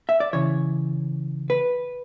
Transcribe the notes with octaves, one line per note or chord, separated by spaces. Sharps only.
E5
D5
C#3 E3 C#5
B4